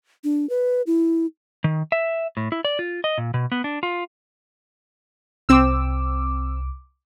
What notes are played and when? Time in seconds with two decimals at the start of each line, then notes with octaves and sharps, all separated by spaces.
0.24 D4
0.50 B4
0.87 E4
1.64 D#3
1.92 E5
2.37 A2
2.52 E4
2.65 D5
2.79 F4
3.04 D#5
3.18 A#2
3.34 B2
3.52 B3
3.64 D4
3.83 F4
5.49 C2 C4 D6 E6